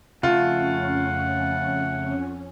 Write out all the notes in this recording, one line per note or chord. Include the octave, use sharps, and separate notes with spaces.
F2 C#3 A3 C#4 F4 F#5